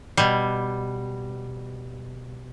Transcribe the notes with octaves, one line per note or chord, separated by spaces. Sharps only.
B2 G3